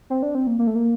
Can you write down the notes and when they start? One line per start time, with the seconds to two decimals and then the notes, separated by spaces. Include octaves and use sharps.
0.10 C4
0.23 D4
0.35 C4
0.47 A#3
0.59 A#3
0.67 A3
0.75 A#3